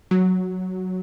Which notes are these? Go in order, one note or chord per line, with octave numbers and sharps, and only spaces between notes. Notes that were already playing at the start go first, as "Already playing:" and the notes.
F#3